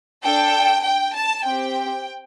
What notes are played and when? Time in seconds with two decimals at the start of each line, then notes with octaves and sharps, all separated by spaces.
0.23 D4 A4 G5
0.83 G5
1.14 A5
1.44 C4 G4 G5